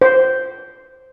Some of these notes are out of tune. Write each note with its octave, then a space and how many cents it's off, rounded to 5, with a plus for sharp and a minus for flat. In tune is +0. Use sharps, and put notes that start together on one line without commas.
C5 -5